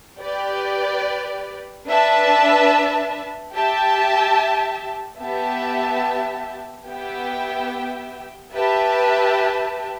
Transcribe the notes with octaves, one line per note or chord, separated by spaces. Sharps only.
G4 B4 D5
D4 B4 E5 A5
G4 E5 A5
B3 G4 E5 A5
B3 G4 E5 G5
G4 B4 E5 A5